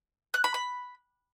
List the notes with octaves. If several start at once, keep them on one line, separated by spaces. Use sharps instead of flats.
F#6
B5
B5